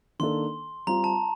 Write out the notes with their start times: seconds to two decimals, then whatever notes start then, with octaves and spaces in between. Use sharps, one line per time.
0.19 D#3 A#3 D4 A4 C6
0.87 G3 C4 F4 A#5
1.04 A5